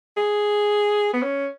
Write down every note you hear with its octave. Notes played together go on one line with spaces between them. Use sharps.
G#4
B3
C#4